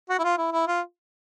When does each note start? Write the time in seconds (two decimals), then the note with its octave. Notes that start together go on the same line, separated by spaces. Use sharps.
0.10 F#4
0.19 E4
0.24 F4
0.38 E4
0.52 E4
0.67 F4